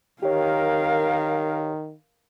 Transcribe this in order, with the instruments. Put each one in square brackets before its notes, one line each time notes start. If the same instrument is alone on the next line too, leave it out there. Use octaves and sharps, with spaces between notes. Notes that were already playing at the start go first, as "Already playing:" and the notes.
[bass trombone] D#3 [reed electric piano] G4 C#5 [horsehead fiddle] A#4 F5